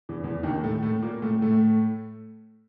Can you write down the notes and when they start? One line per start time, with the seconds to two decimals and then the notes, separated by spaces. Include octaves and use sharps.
0.09 E2 E3
0.23 E2 E3
0.43 D#2 D#3
0.63 A2 A3
0.83 A2 A3
1.02 A#2 A#3
1.22 A2 A3
1.41 A2 A3